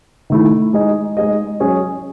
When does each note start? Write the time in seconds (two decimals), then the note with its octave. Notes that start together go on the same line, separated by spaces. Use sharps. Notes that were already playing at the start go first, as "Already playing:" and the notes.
0.30 D#3 A3 E4
0.73 G#3 D#4 G#4 D#5
1.17 G#3 D#4 G#4 D#5
1.60 F#3 C#4 G#4 C#5